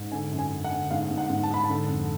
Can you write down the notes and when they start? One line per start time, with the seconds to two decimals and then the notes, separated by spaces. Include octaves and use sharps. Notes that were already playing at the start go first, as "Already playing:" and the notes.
Already playing: G#2
0.12 D3 G#5
0.31 F#2
0.39 G#5
0.52 F#2
0.64 F#5
0.72 D3
0.91 G#2 F5
1.11 G#2
1.18 F#5
1.30 G#2
1.43 A5
1.50 G#2 B5
1.64 A5
1.69 D3
1.88 F2